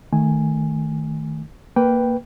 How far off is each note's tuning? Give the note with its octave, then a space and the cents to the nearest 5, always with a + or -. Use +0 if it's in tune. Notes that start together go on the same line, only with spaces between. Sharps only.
D#3 +0 A3 +0 G#5 -5
A#3 +0 B4 +0 G5 +0